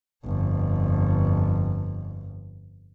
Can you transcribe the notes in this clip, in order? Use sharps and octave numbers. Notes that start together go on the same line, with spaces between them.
G1 F2